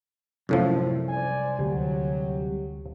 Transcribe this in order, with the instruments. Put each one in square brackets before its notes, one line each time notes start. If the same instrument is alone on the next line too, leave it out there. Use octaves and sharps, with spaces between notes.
[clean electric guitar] C2 [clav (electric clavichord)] F#2 A2 F3
[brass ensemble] C5 D5 G#5
[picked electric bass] D2 [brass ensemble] F#3 G4